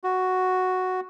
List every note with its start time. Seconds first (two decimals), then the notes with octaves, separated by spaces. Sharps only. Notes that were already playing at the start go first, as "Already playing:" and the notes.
0.04 F#4